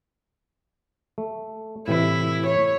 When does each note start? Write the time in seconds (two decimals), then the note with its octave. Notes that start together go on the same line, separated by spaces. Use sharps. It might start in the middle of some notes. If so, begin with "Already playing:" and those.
1.18 A3
1.88 A2 C3 E3 E4
2.46 C#5